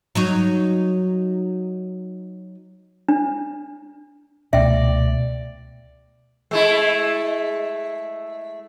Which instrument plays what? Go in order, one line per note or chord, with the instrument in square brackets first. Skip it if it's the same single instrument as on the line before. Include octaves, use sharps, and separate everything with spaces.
[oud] F#3 D#4 C#5
[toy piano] D4
[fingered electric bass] C#2 A3 [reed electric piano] B2 [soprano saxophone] D5 [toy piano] E5 G5
[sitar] G#3 A3 E4